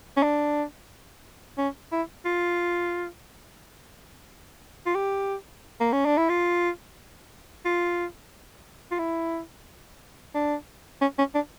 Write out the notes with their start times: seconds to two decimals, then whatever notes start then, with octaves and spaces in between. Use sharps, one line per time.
0.17 C#4
0.23 D4
1.58 C#4
1.92 E4
2.25 F4
4.86 F4
4.95 G4
5.80 A#3
5.92 C#4
6.05 D4
6.17 E4
6.29 F4
7.65 F4
8.91 F4
8.99 E4
10.34 D4
11.01 C#4
11.18 C#4
11.35 D4